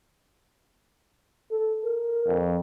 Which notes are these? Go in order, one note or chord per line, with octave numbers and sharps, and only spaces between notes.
A4
A#4
F2